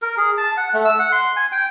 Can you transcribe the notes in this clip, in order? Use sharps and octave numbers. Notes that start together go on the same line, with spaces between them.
A#4
G#4
A5
F#5
A3
E6
F#5
C6
G#5
G5